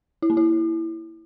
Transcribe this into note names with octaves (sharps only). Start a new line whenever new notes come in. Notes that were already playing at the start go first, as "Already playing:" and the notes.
E4
A#3
E4